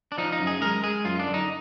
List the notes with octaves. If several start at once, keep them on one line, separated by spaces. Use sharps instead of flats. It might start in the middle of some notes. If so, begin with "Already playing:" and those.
D4
F3 D#4
D#4
F#2
G#4
G#3 A#4
G#3 G#4
F#2 F4
D4
D3
D#4